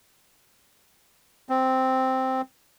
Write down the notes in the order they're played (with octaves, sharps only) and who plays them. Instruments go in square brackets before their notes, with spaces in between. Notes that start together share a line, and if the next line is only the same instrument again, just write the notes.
[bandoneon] C4